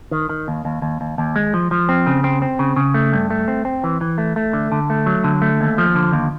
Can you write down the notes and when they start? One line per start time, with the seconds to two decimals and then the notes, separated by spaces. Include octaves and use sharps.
0.11 D#3
0.30 D#3
0.48 D#2
0.65 D#2
0.82 D#2
1.01 D#2
1.18 D#2
1.36 G#3
1.54 F3
1.71 F3
1.89 C4
2.07 C#3
2.24 C4
2.42 C4
2.59 C#3
2.76 C#3
2.94 A3
3.13 G2
3.30 A3
3.48 C4
3.65 C4
3.84 E3
4.01 E3
4.18 A3
4.36 A3
4.53 D3
4.72 D3
4.90 A3
5.06 F#3
5.24 D3
5.42 A3
5.61 D#2
5.78 F3
5.95 D3
6.12 D#2